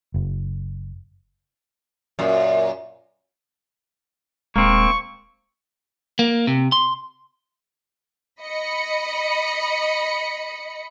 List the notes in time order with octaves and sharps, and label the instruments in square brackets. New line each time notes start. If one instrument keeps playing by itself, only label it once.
[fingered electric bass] F#1
[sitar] F#2 A#2
[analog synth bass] D#1 [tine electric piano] G#3 [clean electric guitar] A#3 C4 [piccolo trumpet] C#6
[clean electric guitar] A#3
C3
C6
[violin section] D#5 B5 C#7